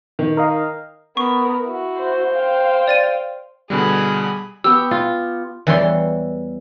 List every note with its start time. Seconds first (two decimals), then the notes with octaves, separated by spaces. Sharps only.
0.19 D#3
0.37 A#4 D#5 F5
1.17 B3 A#4 C#6
1.64 E4 F#4
1.99 C5
2.33 F5 G5
2.88 D5 A6 D#7
3.70 B2 D3 G3 G#4 B5
4.64 B3 G4 E6
4.91 F4
5.67 E2 E3 G3 C#5 C6